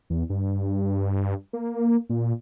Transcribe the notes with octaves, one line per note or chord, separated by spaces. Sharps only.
E2
G2
A#3
A#2